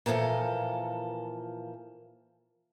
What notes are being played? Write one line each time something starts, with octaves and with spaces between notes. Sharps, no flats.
A#2 E3 F3 D#4 A4 A#4